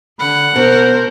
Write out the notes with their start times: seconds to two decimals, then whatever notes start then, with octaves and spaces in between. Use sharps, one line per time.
0.19 D3 F#5 B5
0.56 B2 A#4 C5